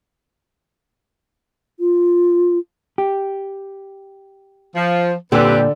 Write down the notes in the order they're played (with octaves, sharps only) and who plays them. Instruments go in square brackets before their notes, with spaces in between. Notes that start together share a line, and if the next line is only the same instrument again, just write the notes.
[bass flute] F4
[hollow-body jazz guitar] G4
[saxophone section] F3
[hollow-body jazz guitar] A#2 [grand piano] D3 E6 [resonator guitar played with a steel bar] G3 [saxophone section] C4 G4 B4